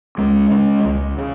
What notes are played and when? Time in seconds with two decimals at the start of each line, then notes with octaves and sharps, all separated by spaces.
0.18 C#2 G#3
0.51 C#3
0.85 C#2
1.18 C#3